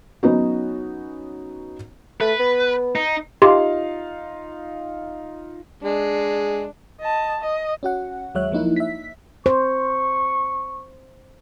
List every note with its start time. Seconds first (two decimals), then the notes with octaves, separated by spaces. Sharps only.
0.23 F#3 B3 C#4 D#4 F#4
2.21 A3 B4
2.40 B3
2.95 D#4
3.42 D#4 F4 G4 F5 C6
5.83 G#3 D4
7.00 D#5 A5
7.40 D#5
7.83 C#4 F#4 F#5
8.34 D#2 F#3 G#3 C#5 E5 F#6
8.52 F3 A#3 D#4 E4
8.76 E5 B6
9.46 C5 C#6